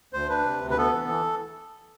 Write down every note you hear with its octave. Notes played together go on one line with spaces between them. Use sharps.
D2 C5
D4 B4
C3
D2
B4
B3 A4
E3
E3